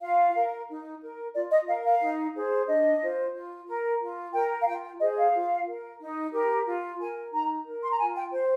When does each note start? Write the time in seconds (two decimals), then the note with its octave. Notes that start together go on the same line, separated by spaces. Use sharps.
0.02 F4 F5
0.35 A#4
0.69 D#4
1.02 A#4
1.35 F4 D5
1.51 D#5
1.68 A#4 F5
1.85 F5
2.01 D#4
2.35 G#4 C5
2.68 D4 D#5
3.01 F4 C5
3.35 F4
3.68 A#4
4.01 F4
4.34 A#4 G5
4.62 F5
4.67 F4 G5
4.84 G5
5.00 G#4 C5 D#5
5.17 F5
5.34 F4
5.67 A#4
6.00 D#4
6.33 G4 A#4
6.66 F4
6.99 A#4 G#5
7.32 D#4 A#5
7.67 A#4
7.83 C6
7.91 A#5
7.99 F4 G#5
8.16 G5
8.32 C5